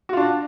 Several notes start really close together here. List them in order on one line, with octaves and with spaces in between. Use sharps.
F#4 F4 D4